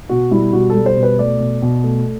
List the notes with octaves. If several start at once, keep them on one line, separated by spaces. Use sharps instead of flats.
B2 F#4
G3 E4
B2 F#4
A4
G3
C5
B2
B4
A3 D5
B2
B2
A3